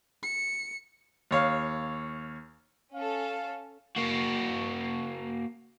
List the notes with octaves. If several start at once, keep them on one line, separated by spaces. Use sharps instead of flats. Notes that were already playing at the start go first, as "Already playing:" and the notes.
C#7
D#2 C#5 F5
C#4 A4 F5
A#3 F#4